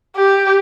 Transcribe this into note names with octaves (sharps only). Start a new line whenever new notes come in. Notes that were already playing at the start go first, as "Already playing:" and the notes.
G4